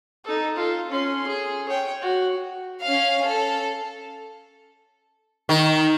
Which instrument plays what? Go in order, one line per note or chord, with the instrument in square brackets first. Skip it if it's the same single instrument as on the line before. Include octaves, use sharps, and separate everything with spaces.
[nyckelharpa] D#4 A4
F4 A4
C#4 C6
G#4
C#5 G5
F#4
[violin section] C#4 F5
A4
[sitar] D#3